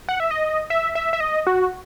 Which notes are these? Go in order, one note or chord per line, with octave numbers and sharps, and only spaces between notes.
F#5
E5
D#5
E5
E5
E5
D#5
F#4